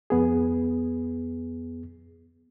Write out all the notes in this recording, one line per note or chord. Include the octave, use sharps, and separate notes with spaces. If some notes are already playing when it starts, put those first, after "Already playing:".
F2 B3 G#4